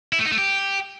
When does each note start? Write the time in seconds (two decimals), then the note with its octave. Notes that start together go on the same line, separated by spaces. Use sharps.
0.13 E4
0.19 A3
0.25 D#4
0.32 A3
0.38 G4